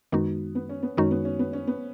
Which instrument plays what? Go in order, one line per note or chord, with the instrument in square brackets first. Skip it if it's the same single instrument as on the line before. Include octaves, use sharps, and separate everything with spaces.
[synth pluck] F#2 D#3 G#3 D#4 F#4 [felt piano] B3
[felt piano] B3
C#4
B3
[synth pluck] F#2 D#3 G#3 D#4 F#4 [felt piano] C#4
[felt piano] B3
C#4
B3
C#4
B3